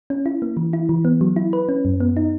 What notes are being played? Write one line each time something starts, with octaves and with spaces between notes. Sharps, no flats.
C#4
E4
A#3
E3
E4
E3
B3
F#3
E4
B4
C#4
F#2
B3
D#4